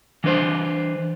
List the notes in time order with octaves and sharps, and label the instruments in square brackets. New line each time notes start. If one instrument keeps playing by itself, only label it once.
[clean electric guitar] E3 D4 B4 C5